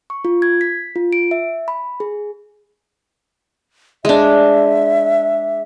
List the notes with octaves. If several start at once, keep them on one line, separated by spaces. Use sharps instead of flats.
C#6
F4
G#6
B6
F4
D7
E5
B5
G#4
G#3 D4 E5